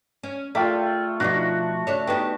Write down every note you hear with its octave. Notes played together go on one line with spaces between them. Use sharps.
C#4
A3 F4 D5 E5 G5
B2 F3 D4 D#4 F4 F#4 D5
C#3 D4 A4 C#5 E5
B3 D4 D#4 G4 A4 G5